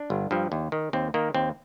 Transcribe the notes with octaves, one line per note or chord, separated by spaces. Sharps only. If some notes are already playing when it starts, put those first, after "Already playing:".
Already playing: D4
G1
G2 F3
D#2
D#3
D#2 C4
D#3 A#3
D#2 C4